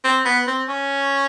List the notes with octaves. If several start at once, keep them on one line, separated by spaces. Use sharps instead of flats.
C4
B3
C4
C#4